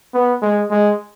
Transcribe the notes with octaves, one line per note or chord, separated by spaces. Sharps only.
B3
G#3
G#3